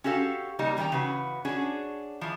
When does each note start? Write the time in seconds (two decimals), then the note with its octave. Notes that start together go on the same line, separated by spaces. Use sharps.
0.04 C#4 F#4 G4 A4 F5
0.59 C#3 G3 A#3 D#4
0.77 D#3 G3 C#4 E4 G5 A#5
0.92 C#3 E3 F#4 B4
1.45 C#4 D4 F#4 G#4
2.21 E3 F3